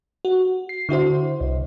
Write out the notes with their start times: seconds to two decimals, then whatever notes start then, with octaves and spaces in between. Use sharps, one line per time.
0.25 F#4
0.69 C7
0.89 D3 E4 F#4 C5
1.40 C2